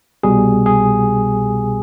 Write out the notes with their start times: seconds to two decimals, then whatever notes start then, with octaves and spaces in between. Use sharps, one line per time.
0.23 C2 B2 G3 G#4
0.66 G#4